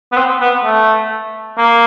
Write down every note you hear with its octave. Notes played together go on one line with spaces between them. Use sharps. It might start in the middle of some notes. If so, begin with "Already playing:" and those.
B3
C4
B3
A3
A#3